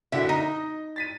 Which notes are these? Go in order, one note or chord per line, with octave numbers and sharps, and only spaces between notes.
F#1 D3 F#4 E5
D#4 D#5
A6 B6 D#7